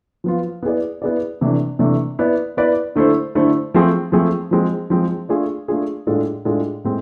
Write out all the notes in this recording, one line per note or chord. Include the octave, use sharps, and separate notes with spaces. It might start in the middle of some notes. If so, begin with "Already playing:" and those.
F3 B3 F4
B3 E4 G#4 B4 D5
B3 E4 G#4 B4 D5
C3 E3 A3 D4
C3 E3 A3 D4
B3 E4 B4 D5
B3 E4 B4 D5
D3 A3 E4 A4 C5
D3 A3 E4 A4 C5
F3 A3 C4 G#4
F3 A3 C4 G#4
F3 G#3 C4
F3 G#3 C4
A3 D4 F4 G#4
A3 D4 F4 G#4
A2 G#3 D4 F4 A4
A2 G#3 D4 F4 A4
A2 G#3 C4